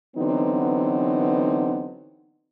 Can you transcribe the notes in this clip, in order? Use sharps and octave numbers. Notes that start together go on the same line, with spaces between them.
D3 E3 F#3 B3 C4 D#4